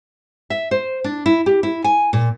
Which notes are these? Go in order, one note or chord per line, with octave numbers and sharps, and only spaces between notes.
E5
C5
D4
E4
G4
E4
G#5
A#2